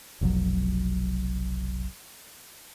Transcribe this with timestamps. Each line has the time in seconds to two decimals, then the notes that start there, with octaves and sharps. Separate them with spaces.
0.21 F1 B1 F2 F#3